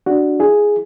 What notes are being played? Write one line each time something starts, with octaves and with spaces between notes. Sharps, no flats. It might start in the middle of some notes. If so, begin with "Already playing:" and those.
D4 F#4
E4 G#4